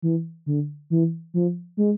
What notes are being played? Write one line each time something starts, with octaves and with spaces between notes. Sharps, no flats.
E3
D3
E3
F3
G#3